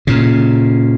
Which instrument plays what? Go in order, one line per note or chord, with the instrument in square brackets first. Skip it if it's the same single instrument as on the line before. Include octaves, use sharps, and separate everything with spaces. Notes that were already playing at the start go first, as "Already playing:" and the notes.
[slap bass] A#2 C#3